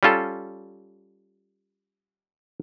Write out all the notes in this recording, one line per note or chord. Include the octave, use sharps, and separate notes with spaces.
G3 C#4 F4 A4